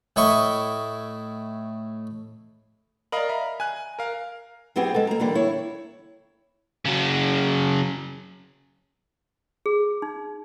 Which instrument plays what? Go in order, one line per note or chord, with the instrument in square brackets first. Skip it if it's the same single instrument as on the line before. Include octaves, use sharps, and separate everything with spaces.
[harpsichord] A2 E4 D#5 C#6
[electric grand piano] A#4 D#5 F5 [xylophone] D5 B5
[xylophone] E5 [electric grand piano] A#5
[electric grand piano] G#5 F#6
A#4 F5
[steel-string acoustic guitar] F#3 B3 C4 E4 G4 G#4
G#3 A4
A#3 A#5
D3 E3 G3 A#3
E4 C#5
[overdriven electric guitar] C#3 F#3
[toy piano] G#4
D#4